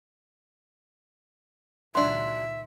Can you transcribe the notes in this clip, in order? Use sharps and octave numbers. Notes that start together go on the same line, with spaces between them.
C#2 A#2 D#3 F#3 D4 E5 C6